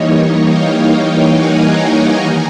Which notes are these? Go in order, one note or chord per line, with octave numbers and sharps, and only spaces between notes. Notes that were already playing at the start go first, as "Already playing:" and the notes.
Already playing: E3 G3 A#3 D#4 C#5 D#5
F5 G5
F#5 G#5
G#5 A#5
D#3